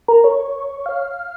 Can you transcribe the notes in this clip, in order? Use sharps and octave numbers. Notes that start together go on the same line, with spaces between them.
A#4
C#5
F5